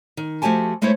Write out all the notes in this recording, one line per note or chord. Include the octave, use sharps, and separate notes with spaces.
D#3
F3 A3 F#4 G4 G#5 A5
G#3 A3 B3 E4 C5 C#5